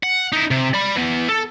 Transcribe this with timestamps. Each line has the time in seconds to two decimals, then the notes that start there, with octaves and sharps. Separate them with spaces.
0.03 F#5
0.33 D#4 E4
0.51 C3
0.74 D5 B5
0.96 E3 B3
1.29 A4